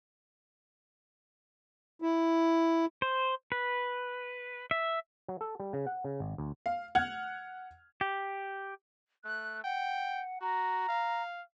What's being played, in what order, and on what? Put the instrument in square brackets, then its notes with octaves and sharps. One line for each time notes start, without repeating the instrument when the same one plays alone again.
[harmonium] E4
[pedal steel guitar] C5
B4
E5
[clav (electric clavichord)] F#3
A4
G3
C#3
F#5
C#3
G#1
D2
[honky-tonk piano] F5
F#5 F6 F#6 G#6
[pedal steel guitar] G4
[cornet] A3 [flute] F#6
[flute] F#5 [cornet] G5
[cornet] F#4 [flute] A#5
[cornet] F5